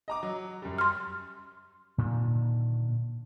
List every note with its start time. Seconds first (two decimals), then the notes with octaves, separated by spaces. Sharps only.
0.08 D#5 A#5 D6
0.23 F#3
0.62 F#2 G3
0.78 C6 F6
1.98 A#2 D3 D#3